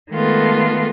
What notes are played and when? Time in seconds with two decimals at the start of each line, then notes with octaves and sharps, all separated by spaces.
0.11 D#3 G#3 A3 B3 F4 A4